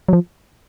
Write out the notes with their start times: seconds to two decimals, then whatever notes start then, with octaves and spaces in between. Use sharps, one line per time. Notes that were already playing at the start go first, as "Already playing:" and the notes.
0.09 F#3
0.13 F3